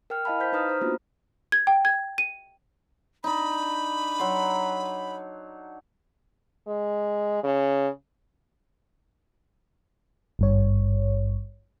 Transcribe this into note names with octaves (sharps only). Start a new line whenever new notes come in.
A#4 G5 F6
E4 D#5 F5 A5 B5
C5 G6 B6
D#4 B4 A#5 D#6 F6
C5 A#5
A#3 B3 D4 F4 F#4
G#6
G5
G#6
D#7
D4 D#4 B5
F#3 C6
G#3
C#3
G#1 G2 C#5